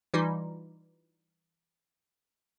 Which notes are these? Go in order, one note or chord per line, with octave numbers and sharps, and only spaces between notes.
E3 G3 D#4 F4